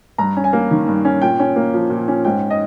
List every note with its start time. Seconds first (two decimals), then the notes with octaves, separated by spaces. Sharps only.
0.18 G2 A#5
0.37 C#4
0.44 G#5
0.53 A#3
0.71 D#3
0.87 G2
1.05 C#4
1.22 A#2 G5
1.40 C#4
1.56 A#3
1.74 F3
1.90 A#2
2.08 C#4
2.25 G#2 G5
2.50 D#5